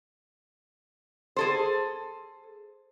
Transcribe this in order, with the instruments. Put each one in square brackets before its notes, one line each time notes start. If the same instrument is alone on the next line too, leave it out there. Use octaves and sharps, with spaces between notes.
[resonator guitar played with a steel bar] G#4 A4 C5